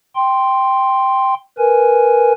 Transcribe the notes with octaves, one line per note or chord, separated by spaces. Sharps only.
G5 C6
A#4 B4 G#5